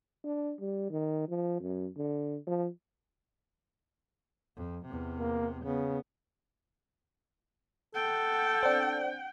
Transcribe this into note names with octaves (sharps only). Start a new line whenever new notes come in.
D4
G3
D#3
F3
F#2
D3
F3
F2
E2 C3
A#3
C#3 B3
A4 F#5 G5
C4 D4